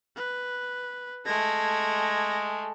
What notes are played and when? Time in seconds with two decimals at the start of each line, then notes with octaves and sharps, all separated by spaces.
0.16 B4
1.26 G#3 A3 G#6 A#6